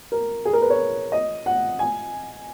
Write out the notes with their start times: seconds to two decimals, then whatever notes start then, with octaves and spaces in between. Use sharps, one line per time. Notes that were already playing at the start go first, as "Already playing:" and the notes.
0.12 A#4
0.45 G#4
0.53 A#4
0.62 B4
0.70 C#5
1.12 D#5
1.46 F#5
1.79 G#5